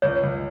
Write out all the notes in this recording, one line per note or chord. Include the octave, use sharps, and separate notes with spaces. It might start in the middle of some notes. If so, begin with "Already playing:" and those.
C#2 C#5
C#2